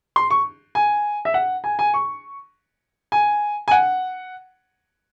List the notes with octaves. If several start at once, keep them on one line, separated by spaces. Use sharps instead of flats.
C6
C#6
G#5
E5
F#5
G#5
G#5
C#6
G#5
G#5
F#5